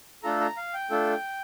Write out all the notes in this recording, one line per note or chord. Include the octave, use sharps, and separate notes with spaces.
A3 D4 F4 A4 A#5
A#5
F5
G5
A3 D4 F4 A4